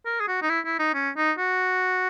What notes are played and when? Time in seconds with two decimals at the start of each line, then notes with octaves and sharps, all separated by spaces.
0.06 A#4
0.20 G#4
0.28 F#4
0.42 D#4
0.49 E4
0.65 E4
0.79 D#4
0.94 C#4
1.17 D#4
1.38 F#4